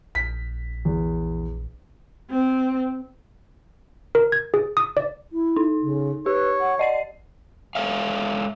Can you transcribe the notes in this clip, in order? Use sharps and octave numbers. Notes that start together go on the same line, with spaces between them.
A#1 B6
E2
C4
A#4
G#6
G#4
D#6
D5
E4
D#4
C#3
G4 B4 C#5
F#5
D5 D#5 F#5 C7
G#3 A4 C#5 E5 F5